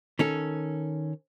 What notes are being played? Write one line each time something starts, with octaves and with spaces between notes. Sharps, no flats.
D#3 C#4 A4